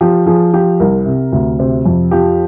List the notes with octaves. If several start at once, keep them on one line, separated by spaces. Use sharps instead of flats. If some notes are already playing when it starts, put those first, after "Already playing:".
F3 G4
F3 G#4
F3 G4
C2 A#4
C3
D2
C3 C5
F2
F3 G4